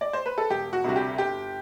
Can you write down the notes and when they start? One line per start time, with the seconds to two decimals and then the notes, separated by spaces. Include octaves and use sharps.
0.01 D5
0.13 C5
0.26 B4
0.38 A4
0.50 E1 G4
0.73 F#4
0.84 D2 C3 G3 F#4
0.96 G4
1.18 G1 G4